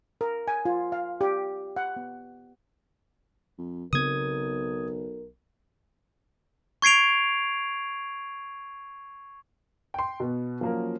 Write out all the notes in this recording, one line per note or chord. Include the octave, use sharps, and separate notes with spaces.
A#4
G#5
F4
F5
G4
F#5
B3
F2
B1 C#3 B3 C4 A#4 D#6 G#6
C#6 G#6 C7 D7 F7
G5 C6
B2 B3
F3 F#3 A#3 C#4 A#4